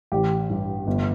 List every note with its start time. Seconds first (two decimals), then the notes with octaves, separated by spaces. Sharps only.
0.12 A1 G4
0.50 G2
0.87 G1